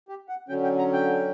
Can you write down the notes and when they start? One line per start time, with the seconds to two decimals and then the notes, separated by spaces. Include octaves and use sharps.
0.09 G4
0.29 F#5
0.48 D3 F#3 C#4 G5
0.63 G5
0.78 A#5
0.93 G5